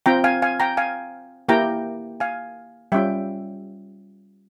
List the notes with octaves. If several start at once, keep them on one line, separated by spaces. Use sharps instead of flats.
C4 F4 G5 A#5
F5 G#5
F5 G#5
G5 A#5
F5 G#5
A#3 E4 G4 G5 A#5
F5 G#5
G3 C#4 F4 E5 G5